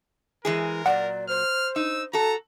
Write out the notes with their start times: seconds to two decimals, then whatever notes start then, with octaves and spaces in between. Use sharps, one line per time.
0.45 E3 G#3 G#4 A#4
0.86 A#2 F#3 D5 F#5
1.28 C5 F6
1.76 D#4 E6
2.13 F#4 A4 A#5